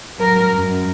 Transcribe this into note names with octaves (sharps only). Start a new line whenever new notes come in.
F#3 A#4
F#2